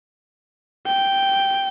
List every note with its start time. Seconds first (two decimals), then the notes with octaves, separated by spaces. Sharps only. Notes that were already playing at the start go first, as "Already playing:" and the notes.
0.86 G5